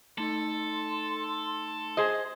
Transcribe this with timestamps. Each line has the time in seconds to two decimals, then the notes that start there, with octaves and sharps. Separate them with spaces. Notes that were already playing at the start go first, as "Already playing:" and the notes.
0.18 A3 D#4 A4 C6
1.97 G#4 C5 D#5